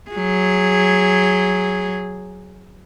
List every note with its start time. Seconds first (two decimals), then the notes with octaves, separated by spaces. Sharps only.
0.11 F#3 G#4